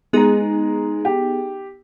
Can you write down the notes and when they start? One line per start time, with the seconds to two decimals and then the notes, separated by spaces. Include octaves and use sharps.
0.13 G#3 B3 D#4 G#4 A#5
1.05 G4